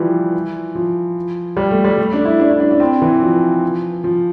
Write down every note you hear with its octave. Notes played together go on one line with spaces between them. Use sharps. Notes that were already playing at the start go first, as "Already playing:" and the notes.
Already playing: E3 F3 G3
F3
G3
A3
G3
A3
D4
E4
D4
E4
D4
D4
C4
E3
F3
F3